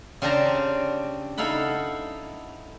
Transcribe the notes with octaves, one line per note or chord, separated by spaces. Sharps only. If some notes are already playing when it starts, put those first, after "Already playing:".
C#3 C4 D4 G4 D5 A#5
D#4 E4 A4 F5 F#5 B5